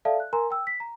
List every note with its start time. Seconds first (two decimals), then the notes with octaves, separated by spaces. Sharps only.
0.05 A4 D5 E5 F5 A5
0.20 F#6
0.33 A#4 G#5 A#5 C6
0.50 G5 E6
0.67 B6
0.80 A#5